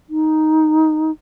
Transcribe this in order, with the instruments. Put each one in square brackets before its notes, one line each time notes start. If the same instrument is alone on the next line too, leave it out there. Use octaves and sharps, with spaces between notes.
[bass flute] D#4